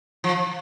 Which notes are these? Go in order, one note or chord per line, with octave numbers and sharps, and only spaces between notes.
F3